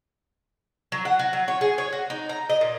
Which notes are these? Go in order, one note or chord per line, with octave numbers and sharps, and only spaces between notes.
F#3
F#5
F#4
F#3
C#5
G#4
C#5
F#4
D#4
A#5
D#5
A#2